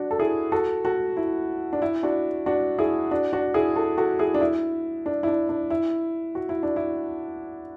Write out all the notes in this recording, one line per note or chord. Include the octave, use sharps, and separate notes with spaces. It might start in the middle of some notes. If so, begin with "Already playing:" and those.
Already playing: D4 F#4
A4
E4 G#4
F#4 A4
F#4 A4
E4
D4
E4
D4 F#4
D4 F#4
E4 G#4
D4 F#4
D4 F#4
E4 G#4
F#4 A4
F#4 A4
E4 G#4
D4
E4
D4
E4
D4
D4
E4
F#4
E4
D4
E4